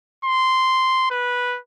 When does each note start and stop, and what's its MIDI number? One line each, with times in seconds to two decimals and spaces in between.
0.25 1.06 84
1.10 1.58 71